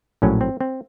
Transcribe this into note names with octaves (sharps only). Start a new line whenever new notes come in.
A#1 A2 F#3 C#4
C4
C4